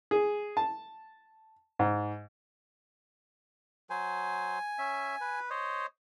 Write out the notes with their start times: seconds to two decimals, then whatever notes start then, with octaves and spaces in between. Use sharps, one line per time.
0.11 G#4
0.57 A5
1.79 G#2
3.90 F#3 C5 G#5
4.78 C#4 E5
5.21 B4
5.50 C5 C#5 D#5